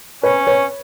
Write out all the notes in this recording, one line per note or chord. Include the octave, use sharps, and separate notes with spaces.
C#4 B4 C#5
B4 C#5